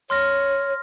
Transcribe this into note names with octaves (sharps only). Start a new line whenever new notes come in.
C#5 C6 F6 A#6